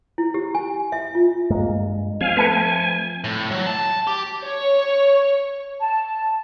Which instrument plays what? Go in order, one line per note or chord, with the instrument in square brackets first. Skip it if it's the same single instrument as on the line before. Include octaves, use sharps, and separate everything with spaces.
[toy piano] E4
G4
G#5
E5
F4
[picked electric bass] G2 G#3 A#3
[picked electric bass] F3 C4 [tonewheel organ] F5 G#5
[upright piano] A3 A5 C#7 [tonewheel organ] B4 G#5
[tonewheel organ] G#5
[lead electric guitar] A2
F#3
A5
G4
[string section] C#5
[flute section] A5